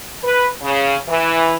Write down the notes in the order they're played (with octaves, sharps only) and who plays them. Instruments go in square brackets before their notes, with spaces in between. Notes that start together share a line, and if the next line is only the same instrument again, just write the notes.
[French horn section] B4
C#3
E3